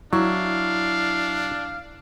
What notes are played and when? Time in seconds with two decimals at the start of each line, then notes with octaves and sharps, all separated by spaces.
0.13 F#3 D4 E4 F5